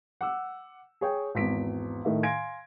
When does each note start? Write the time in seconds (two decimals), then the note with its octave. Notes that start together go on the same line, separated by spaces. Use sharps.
0.21 F#5 D6 E6
1.01 G#4 C#5 G5
1.35 G#1 E2 B6 D7
2.05 A2 D#3 A3 E5
2.23 F5 G#5 C6 G#6 A#6 D7